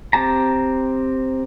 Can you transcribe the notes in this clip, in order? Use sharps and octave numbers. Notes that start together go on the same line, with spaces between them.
C4 G4 A5 A#5